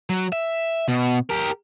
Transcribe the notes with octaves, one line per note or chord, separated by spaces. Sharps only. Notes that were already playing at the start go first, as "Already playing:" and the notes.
F#3
E5
B2
G4 A#4